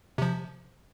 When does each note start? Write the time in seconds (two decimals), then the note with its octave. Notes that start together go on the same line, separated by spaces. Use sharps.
0.18 C3 F3